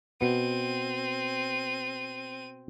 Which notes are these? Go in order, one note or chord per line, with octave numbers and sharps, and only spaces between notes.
B2 B3 C4 D#7